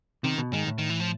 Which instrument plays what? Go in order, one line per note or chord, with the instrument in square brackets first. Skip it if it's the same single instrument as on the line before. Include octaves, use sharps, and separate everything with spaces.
[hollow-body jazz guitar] C3 [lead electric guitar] D#3
[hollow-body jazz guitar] B2
[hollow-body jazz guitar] G#2 [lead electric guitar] D#3
[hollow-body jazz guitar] A2
[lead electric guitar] D#3
E3
F3